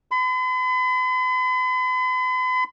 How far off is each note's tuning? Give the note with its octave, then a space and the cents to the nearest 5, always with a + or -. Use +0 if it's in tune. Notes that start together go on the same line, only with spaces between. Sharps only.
B5 +45